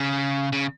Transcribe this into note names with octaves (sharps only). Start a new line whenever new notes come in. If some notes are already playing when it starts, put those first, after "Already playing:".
Already playing: C#3
C#3